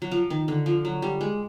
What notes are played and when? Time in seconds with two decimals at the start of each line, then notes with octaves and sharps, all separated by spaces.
0.02 F#3
0.11 F3
0.30 D#3
0.48 D3
0.66 F3
0.85 F#3
1.02 G3
1.21 G#3